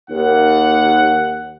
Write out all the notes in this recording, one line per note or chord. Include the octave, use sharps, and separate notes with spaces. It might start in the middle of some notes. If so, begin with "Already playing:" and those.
D#2 F#5